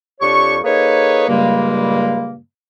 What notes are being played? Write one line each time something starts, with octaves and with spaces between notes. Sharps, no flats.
F2 D4 G4 C#5 C#6
A#3 D#4 G#4 A4 B4 C#5
G2 A#2 C#3 G3 G#3 A#3